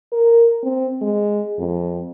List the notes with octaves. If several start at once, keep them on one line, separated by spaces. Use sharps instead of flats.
A#4
C4
G#3
F2